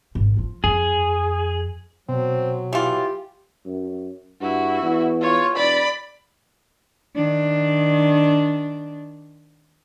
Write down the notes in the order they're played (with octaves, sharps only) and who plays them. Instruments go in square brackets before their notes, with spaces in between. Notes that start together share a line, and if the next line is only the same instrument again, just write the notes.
[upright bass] G#1 C#3
F3 F4
[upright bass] F2 [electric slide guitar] G#4
[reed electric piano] B2 [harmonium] F#3 [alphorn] C4
[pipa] E3 F4 [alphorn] G4
[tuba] F#2
[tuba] G2 [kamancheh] E4 F#4
[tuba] E2
[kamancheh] F4 C#5
[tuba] E1 [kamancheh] D5 B5
[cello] D#3 D4